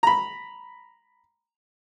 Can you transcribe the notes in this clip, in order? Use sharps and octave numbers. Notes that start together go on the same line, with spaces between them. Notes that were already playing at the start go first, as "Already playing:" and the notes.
A#5 B5